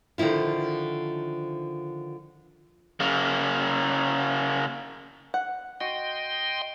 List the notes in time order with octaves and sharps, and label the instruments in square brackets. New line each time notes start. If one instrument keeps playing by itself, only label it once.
[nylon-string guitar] D3 D#3 F3 E4 F4
[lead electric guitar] C#3 A#3
[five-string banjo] F#5
[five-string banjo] F#4 [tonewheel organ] D#5 G5 C6